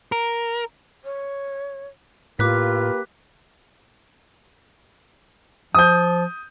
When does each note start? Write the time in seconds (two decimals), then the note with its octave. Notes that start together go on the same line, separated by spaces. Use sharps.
0.12 A#4
1.05 C#5
2.39 A2 A#3 F4 G4 B4 D6 F#6 B6
5.75 F3 D#6 G6